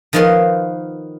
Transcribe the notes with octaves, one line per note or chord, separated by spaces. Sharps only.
D#3 F3 B3 D#4 A#4 C6